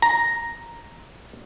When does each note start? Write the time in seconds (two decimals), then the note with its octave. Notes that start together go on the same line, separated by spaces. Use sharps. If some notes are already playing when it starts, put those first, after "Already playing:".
0.02 A#5